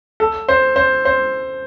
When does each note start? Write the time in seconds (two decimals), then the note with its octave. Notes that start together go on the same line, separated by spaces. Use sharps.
0.20 A4
0.48 C5
0.76 C5
1.05 C5